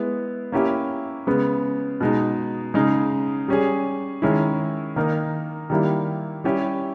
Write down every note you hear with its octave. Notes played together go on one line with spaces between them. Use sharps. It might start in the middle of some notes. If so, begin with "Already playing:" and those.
Already playing: G#3 B3 E4
A#3 C#4 E4 G4
C#3 G#3 B3
B2 G#3 D#4
C#3 G#3 D#4 G#4
G3 C#4 G#4
D#3 G#3 C#4 E4
D#3 A#3 D#4 A#4
D#3 G3 A#3 E4
G3 C#4 E4 G4